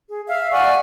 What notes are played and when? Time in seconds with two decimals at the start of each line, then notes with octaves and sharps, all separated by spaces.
0.10 G#4
0.27 E5 F5
0.52 D5 F#5 G#5 C#6